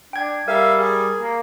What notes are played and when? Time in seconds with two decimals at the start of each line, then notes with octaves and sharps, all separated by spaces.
0.13 D4 G5 G#6
0.48 G3 A#4 E5 F5
0.79 G#4
1.20 A#3